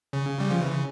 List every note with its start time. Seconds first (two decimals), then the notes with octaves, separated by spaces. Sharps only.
0.13 C#3
0.40 G3
0.50 F3
0.62 E3
0.72 C#3